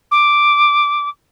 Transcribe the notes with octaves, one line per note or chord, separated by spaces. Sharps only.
D6